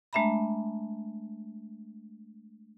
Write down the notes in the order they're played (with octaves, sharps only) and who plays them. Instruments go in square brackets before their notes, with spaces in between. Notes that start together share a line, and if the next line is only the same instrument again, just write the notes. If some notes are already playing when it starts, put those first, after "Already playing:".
[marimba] G#3 A3 D4 E5 A#5 B5